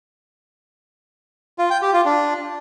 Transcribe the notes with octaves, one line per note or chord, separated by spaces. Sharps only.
F4
G5
G4
F4
D4